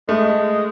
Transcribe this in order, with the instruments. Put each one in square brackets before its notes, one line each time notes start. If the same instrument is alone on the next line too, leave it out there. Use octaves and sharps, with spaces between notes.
[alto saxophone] G#3 [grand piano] A3